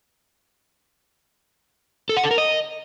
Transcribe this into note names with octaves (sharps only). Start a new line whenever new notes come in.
A4
F#5
A4
A#4
D#5